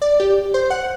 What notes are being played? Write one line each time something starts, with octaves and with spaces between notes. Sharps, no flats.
D5
G4
C5
F#5